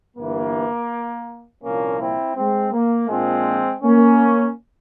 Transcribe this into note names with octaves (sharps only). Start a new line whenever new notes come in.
G1 G2 E3 A#3
C2 A#2 F3 A#3 C#4
C4 E4
G#3 C4
A#3
A#1 A#2 F3 G#3 C4
A#3 C#4